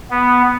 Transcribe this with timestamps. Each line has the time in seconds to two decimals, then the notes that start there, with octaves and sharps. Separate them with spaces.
0.10 B3